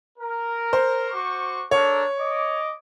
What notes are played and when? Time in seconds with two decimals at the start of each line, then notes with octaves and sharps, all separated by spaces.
0.19 A#4
0.73 C5
1.10 F#4 C#6 D6
1.71 D4 A4 A#4 C#5
2.19 D#5 D6